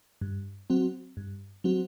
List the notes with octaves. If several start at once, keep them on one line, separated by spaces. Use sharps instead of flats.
G2
F#3 C4 F#4
G2
F#3 C4 F#4